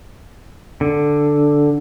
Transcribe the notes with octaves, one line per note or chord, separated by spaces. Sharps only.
D3